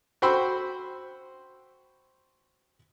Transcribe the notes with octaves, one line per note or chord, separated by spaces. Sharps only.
F#4 C5 G5 B5 C6 E6